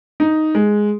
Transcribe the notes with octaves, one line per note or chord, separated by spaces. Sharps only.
D#4
G#3